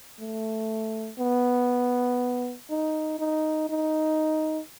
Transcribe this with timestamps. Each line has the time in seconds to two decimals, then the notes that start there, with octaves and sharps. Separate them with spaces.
0.20 A3
1.19 B3
2.70 D#4
3.19 D#4
3.69 D#4